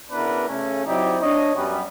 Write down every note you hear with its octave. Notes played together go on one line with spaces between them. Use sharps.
C#3 B3 D4 E4 A#4 B4
C#3 A3 C#4
F#3 C4 D#4 E4 G4 D5
D4 C#5 D#5
F#2 G3 B3